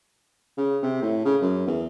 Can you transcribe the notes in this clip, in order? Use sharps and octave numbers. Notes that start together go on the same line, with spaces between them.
C#3
C3
A2
C#3
F#2
E2